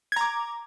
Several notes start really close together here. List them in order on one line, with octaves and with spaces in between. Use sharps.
G#6 A#5 D6